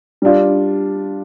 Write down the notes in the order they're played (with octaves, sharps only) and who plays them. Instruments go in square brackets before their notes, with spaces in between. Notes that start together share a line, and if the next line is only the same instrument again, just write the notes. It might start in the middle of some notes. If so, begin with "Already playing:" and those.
[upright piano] G3 D4 F4